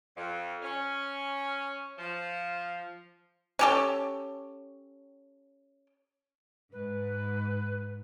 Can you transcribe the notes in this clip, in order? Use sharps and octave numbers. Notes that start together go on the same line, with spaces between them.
F2
C#4
F3
C#4 G4 A4
G#2 B4